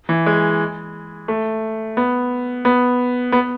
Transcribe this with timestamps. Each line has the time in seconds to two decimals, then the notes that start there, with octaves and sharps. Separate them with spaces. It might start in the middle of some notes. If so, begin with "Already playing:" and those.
0.09 E3
0.26 G#3
1.28 A3
1.97 B3
2.65 B3
3.32 B3